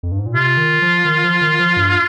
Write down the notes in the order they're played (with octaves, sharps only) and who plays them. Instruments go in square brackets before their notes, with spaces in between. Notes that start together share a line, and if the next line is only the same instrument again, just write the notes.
[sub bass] F2
G2
G#2
A#2
[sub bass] C3 [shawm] F4
[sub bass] D#3
F3
D#3
F3
D#3
F3
G2